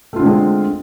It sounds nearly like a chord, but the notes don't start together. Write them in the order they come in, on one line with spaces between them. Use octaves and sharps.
A3 F4 D3 C4 G#3